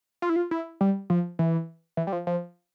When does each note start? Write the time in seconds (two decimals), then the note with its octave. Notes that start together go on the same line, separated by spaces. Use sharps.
0.22 F4
0.29 E4
0.36 F4
0.51 E4
0.81 G3
1.10 F3
1.39 E3
1.97 E3
2.07 G3
2.13 F3
2.27 F3